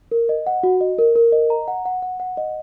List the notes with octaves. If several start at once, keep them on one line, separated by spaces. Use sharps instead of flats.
A#4
D#5
F#5
F#4
D#5
A#4
A#4
D#5
A#5
F#5
F#5
F#5
F#5
D#5